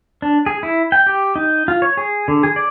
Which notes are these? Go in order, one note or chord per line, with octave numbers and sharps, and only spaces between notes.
D4
G#4
E4
G5
G4
D#4
F4
C#5
G#4
D3
G#4
D5